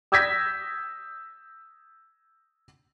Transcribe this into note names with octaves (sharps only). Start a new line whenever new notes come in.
D#6 E6 G6 G#6 A#6 B6